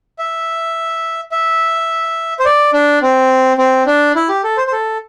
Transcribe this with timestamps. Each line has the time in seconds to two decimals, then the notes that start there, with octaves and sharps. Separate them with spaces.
0.19 E5
1.32 E5
2.39 C5
2.45 D5
2.73 D4
3.02 C4
3.58 C4
3.86 D4
4.16 E4
4.29 G4
4.44 A4
4.57 C5
4.67 C5
4.72 A4